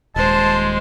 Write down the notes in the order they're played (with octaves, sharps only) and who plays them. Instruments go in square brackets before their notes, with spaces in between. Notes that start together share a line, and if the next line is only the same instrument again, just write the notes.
[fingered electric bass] D#1 [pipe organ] G#3 [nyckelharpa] C5 [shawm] A5